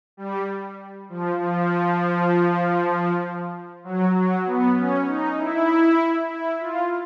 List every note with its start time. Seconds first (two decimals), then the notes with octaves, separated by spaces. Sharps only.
0.17 G3
1.09 F3
1.40 F3
3.84 F#3
4.15 F#3
4.46 B3
4.76 C#4
5.07 D#4
5.37 E4
6.29 E4
6.60 F4